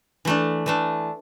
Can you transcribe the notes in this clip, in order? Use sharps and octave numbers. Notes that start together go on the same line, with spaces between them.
E3 A3 D4
E3 A3 D4